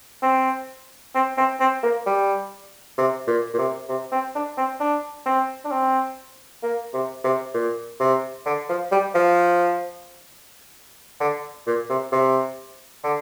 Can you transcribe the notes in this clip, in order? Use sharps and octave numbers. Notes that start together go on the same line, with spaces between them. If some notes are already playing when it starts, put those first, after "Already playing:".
C4
C4
C4
C4
A#3
G3
C3
A#2
A#2
C3
C3
C4
D4
C4
D4
C4
D4
C4
A#3
C3
C3
A#2
C3
D3
F3
G3
F3
D3
A#2
C3
C3
D3